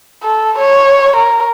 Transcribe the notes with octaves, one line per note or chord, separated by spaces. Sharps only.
A4
C#5
A#4